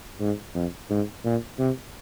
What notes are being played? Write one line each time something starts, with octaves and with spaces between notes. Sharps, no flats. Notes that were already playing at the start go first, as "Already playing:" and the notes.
G#2
F2
G#2
A#2
C3